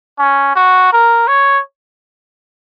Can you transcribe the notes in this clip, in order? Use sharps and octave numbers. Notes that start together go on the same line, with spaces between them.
C#4
F#4
A#4
C#5